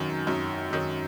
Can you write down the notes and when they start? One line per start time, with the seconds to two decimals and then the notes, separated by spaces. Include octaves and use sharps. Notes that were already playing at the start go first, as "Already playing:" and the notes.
Already playing: F#2 D#3 F#3
0.27 F#2
0.71 D#3 F#3